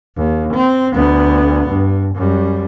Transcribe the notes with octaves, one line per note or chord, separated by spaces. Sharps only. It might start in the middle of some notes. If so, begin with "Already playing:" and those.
D#2
C4
D2 B3
G2
F#2 G3